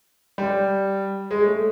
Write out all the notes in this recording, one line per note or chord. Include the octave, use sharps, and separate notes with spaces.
G3
G#3
A3